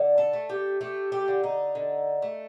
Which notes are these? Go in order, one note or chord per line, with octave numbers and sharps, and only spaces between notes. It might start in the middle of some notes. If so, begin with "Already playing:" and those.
Already playing: D3
A4
A3
G4
A3 G4
G4
D3
D#4
D3
A3